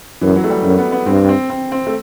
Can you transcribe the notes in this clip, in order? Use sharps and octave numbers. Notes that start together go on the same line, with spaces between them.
F#2 E3
F#3
A3
G3
F#2 A3
B3
B3
G2 C4
C4
C4
C4
A3